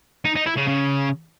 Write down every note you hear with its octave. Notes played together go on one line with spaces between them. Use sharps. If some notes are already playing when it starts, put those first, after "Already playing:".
D#4
D#4
E4
C#3
C#3